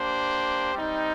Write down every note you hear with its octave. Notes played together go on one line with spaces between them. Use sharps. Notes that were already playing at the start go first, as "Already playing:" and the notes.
Already playing: A#3 D4 G4 C5
G3 C4 D#4